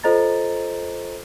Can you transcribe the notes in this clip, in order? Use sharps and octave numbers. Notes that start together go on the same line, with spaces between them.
F4 A4 C5 D#5 A#5 A6